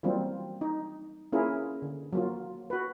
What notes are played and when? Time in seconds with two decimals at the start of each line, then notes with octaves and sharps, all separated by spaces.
0.03 E3 F#3 G3 A#3 C4 F4
0.61 D#4
1.32 A#3 C#4 E4 F4 G#4 A#4
1.82 D3
2.13 F#3 A#3 F4
2.70 F#4 B4